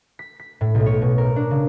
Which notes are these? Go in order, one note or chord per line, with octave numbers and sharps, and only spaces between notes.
B6
B6
A2
B1
C#5
B2
A#4
D4
C#3